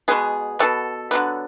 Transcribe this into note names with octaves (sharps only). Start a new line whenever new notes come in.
B2 G#3 B3 G#4
B2 G#3 B3 A4
D3 F#3 B3